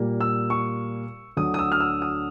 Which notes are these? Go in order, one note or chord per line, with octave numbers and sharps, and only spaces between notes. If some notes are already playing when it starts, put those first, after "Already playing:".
Already playing: A#2 G3 A#3
E6
C#6
D2 D3 F#3 D#6
D#6
E6
F6
E6
D#6